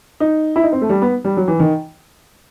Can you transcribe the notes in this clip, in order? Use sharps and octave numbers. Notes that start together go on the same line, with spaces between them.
D#4
E4
D#4
C4
A3
G3
B3
G3
F#3
E3
D#3